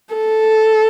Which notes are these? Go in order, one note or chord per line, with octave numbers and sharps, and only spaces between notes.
A4